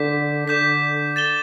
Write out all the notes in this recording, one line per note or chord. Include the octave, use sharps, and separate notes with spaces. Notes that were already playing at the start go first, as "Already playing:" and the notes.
Already playing: D3 D6 G6 B6
D3 D6 G6 B6
A6 E7 G7